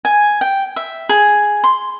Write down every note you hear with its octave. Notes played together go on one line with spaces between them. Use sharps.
G#5
G5
E5
G#4
C6